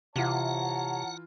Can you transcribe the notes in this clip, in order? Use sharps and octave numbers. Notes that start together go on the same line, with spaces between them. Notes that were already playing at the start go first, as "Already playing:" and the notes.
C3 E3 F4 C#5 F#5 A5 A#5